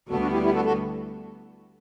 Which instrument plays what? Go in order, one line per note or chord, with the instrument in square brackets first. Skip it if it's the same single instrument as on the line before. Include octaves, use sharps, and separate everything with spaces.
[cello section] D2 D3 G3 B3 [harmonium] F#4 A4
[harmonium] D4 F#4
E4 G4
E4 G4
F#4 A4
F#4 A4